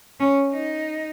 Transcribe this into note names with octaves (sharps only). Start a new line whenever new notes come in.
C#4
D#4